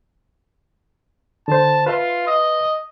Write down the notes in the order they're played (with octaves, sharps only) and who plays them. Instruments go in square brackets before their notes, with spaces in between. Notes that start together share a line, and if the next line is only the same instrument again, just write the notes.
[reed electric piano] D3 C5 [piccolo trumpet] A5
[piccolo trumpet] F4 [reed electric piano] B4 E5 C6
[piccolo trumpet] D#5